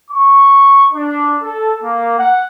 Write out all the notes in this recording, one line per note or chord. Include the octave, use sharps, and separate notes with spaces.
C#6
D4
A4
A#3
F#5